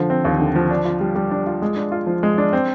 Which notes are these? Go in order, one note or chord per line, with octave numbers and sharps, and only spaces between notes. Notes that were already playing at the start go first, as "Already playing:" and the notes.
Already playing: D3 F3
C4
D#2
D3
F3
D4
F4
G3
G3
D4
F4
G#3
D4
F4
F3
G#3
D4
C4